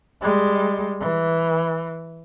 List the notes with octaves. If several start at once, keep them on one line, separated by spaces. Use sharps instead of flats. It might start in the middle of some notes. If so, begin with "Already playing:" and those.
G3 G#3
E3